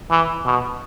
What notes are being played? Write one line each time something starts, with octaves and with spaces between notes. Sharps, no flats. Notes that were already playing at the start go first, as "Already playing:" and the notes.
E3
B2